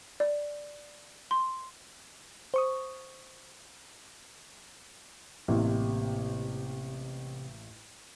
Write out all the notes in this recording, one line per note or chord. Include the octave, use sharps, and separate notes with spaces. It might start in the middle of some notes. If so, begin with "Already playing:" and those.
D5
C6
C5 C#6 D#6
A1 C3 A#3